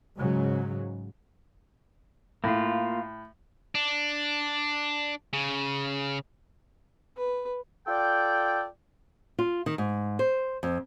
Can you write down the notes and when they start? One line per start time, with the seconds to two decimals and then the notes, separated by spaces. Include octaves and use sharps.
0.17 G#2 C#3 F#3
2.44 A2 A#3 F4
3.75 D4
5.33 C#3
7.17 B4
7.87 F4 A4 D5 G5
9.39 F4
9.66 D#3
9.78 G#2
10.19 C5
10.63 F2